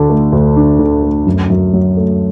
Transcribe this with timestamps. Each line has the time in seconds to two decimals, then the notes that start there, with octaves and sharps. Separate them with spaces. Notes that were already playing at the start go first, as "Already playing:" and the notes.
Already playing: D2 D3 D4
0.10 A3
0.32 D2
0.56 D4
0.79 D3
1.03 A3
1.26 F#2
1.50 F#2
1.73 F#3
1.97 A3